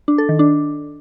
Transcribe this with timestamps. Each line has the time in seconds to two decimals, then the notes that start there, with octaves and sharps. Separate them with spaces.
0.08 D4
0.18 A4
0.29 D#3
0.39 D4